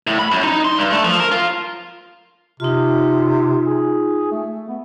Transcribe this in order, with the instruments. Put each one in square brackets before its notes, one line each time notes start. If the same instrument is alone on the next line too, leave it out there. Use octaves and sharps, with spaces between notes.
[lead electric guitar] A2
B5
F#2
D#4
C6
G2
A3
F3
A#4
F4
[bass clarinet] C3 [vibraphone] D#4 F4
[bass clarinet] G#4
A3
B3